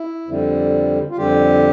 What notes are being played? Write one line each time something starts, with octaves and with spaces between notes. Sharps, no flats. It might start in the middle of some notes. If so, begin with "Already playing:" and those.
Already playing: E4
F2 D3 G3
F4
F2 D3 G3 G4